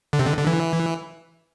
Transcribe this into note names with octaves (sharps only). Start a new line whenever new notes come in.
D3
C3
D3
D3
E3